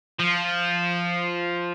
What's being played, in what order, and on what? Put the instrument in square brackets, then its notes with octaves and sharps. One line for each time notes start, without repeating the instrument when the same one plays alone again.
[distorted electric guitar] F3